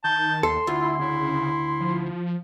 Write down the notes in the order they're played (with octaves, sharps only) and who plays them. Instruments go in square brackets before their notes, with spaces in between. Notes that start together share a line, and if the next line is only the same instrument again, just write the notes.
[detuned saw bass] D#3 [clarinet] A5 [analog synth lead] G6
[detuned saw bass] D#2 [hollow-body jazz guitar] A4 [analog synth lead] C6
[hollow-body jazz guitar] D2 [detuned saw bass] E4 [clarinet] F4
[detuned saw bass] C#3 [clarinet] E4
[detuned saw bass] F3